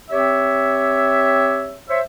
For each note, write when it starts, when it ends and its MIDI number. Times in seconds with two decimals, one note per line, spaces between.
0.11 1.76 60
0.11 1.76 67
0.11 1.76 73
0.11 1.76 76
1.90 2.01 72
1.90 2.01 73
1.90 2.01 76